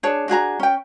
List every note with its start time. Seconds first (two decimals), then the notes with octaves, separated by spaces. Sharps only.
0.03 D4 G#4 C#5 A5
0.28 D4 F#4 G#4 A#5
0.60 C#4 G5